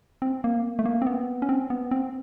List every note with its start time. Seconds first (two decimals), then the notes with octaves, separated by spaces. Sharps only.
0.22 C4
0.44 A#3
0.79 A3
0.85 A#3
1.02 C4
1.07 B3
1.42 C#4
1.49 C4
1.70 B3
1.91 C4